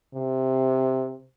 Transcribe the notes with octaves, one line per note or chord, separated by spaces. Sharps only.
C3